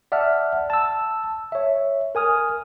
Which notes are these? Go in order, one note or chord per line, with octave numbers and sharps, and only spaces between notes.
D5 E5 F#5 A5 F6
A5 E6
C#5 E5
A#4 G#5 D#6 F6